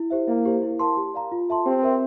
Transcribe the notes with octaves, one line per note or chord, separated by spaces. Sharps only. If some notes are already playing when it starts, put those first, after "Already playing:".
Already playing: E4
G4 C5 E5
A#3 E4
G4 C5
E4
A#4 F5 A5 C6
G4
D5 F5 A#5
F4
A4 E5 A5 C6
C4 G4
A#4 E5